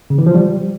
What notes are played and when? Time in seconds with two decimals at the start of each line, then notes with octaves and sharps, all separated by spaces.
0.10 C#3
0.18 E3
0.26 F3
0.35 G3